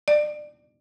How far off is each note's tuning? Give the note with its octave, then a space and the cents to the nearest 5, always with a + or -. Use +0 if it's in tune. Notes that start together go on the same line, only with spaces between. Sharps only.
D5 +25